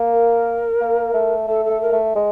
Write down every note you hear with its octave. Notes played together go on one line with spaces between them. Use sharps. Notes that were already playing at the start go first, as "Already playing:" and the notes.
Already playing: A#3
A#4
A#3
A3
A3 A4
A4
A3
A#4
A3
G#3